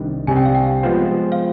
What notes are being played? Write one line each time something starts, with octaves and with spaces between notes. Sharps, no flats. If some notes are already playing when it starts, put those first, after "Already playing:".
Already playing: C2 C3 D#3 G3 D4
C2 C3 G3 C4 G4 G#5
G5
F5
G5
F3 G#3 B3 F4 C5
F5